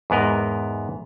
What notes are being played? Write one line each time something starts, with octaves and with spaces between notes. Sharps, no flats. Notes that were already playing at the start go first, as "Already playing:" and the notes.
E2 G#2 B3 A#4 D#5